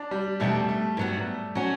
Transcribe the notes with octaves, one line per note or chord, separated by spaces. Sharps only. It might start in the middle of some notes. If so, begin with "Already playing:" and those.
Already playing: D4
G3
E2 B2 G3 A3 D4
A3
G2 F#3 B3 F#4
F#3 C#4 F#4